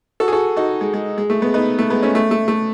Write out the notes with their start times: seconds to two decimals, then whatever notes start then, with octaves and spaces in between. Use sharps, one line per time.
0.20 F#4 A4
0.28 G#4
0.33 F#4 A4
0.56 D#4 F#4
0.81 G#3
0.93 G#3
1.18 G#3
1.30 A3
1.42 G#3 B3
1.54 B3 D#4
1.79 A3
1.90 G#3 B3
2.03 A3 C#4
2.15 A3
2.31 A3
2.48 A3